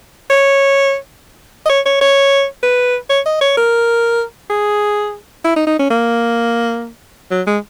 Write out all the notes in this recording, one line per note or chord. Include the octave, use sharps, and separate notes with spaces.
C#5
D#5
C#5
C#5
C#5
B4
C#5
D#5
C#5
A#4
G#4
E4
D#4
D#4
C#4
A#3
F#3
G#3